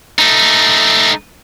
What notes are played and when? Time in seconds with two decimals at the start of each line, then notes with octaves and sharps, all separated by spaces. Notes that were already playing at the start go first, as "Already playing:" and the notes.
0.19 A3 D#4